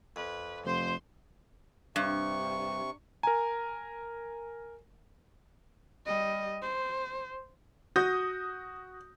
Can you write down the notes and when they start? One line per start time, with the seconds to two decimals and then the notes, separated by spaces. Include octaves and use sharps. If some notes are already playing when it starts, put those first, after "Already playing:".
0.16 F2 B4
0.65 F1 C5 C6
1.96 G2 C3 C#6
3.23 A#4 G#5 A#5
6.06 G3 D#5
6.62 C5
7.96 F#4 D#6 G6 A#6